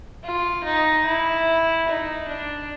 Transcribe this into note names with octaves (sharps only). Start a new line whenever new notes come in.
F4
D#4
E4
D#4
D4